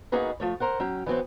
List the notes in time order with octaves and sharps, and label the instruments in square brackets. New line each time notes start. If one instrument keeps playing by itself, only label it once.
[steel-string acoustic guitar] A#3 B3 D#4 F#4 G#4 B4
F3 A3 C#5
A#4 C5 F#5
F#3 C#4 G5
E3 F#3 B3 C4